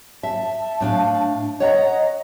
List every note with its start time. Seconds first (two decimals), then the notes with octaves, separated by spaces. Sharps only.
0.23 E5 A5
0.80 A2 D4 F5
1.60 C#5 D#5 F#5 A#5